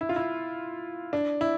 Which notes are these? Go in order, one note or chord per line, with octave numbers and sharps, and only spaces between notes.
E4
F4
E4
D4
E4